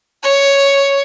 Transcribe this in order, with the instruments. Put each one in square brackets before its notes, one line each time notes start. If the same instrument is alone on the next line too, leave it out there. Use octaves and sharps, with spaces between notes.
[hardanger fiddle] C#5